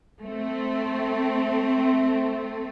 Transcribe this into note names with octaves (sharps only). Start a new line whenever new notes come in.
A3 C4